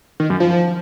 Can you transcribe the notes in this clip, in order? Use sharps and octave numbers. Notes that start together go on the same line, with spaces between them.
D#3
F#2
F3